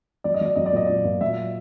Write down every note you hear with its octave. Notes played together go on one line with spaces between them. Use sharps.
F#3 D5
D#5
F#3 D5
F#3 D#5
D5
A#2 D#5
F#3 D5
A#2
F#3 E5